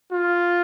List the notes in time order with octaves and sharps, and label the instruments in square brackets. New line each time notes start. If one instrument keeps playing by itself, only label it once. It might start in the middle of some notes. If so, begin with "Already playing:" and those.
[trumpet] F4